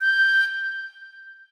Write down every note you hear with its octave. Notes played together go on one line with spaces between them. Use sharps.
G6